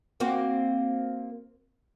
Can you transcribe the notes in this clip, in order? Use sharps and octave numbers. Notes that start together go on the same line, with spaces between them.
A#3 C4 F#4